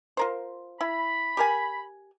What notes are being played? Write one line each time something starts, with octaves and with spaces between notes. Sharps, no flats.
F4 A#4 C5
E4 B5
G4 A#4 G#5